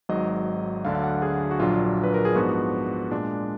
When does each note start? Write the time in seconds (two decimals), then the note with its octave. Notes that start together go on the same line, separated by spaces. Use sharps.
0.09 G#1 G#2 F#3 D#5
0.85 D2 D3 F#3 D4 F5
0.95 F5
1.04 F#5
1.22 G#4
1.51 F#4
1.60 A#1 A#2 F#3 D4 F4
2.04 B4
2.14 A#4
2.25 G#4
2.35 G#2 F3 B3 D4 F#4
3.11 A#2 G#3 D4